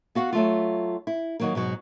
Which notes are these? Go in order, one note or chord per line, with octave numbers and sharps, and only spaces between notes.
B3 F#4 F5 F#5
F#3 A3 F4
E4
D#3 F#3 A#3
G#2 B2 F#3